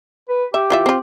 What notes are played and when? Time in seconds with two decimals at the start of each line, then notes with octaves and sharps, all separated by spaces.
0.29 B4
0.54 G4 E5
0.70 E3 F4 E5
0.86 C4 F4